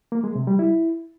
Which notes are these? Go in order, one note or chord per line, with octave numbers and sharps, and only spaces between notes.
A#3
G#3
C3
G3
E4